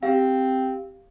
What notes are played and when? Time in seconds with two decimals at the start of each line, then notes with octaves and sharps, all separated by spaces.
0.03 C4 G4 F5